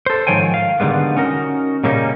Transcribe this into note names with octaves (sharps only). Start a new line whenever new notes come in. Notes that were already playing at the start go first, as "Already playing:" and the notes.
A4 C5
G#2 D#3 F3 C#5 G5 G#5
F5
D3 D#3 G3 G#3 B3
C#4 D#4 F#4 A#4
A#2 C#3 G3 A#3 C#4 D#4